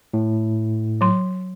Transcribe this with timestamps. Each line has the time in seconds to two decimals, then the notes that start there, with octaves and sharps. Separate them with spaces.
0.14 A2
1.01 F#3 C6